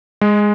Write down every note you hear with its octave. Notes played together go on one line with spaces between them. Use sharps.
G#3